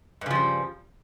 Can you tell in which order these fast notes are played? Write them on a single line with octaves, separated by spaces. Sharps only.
G2 C#3 F3 G3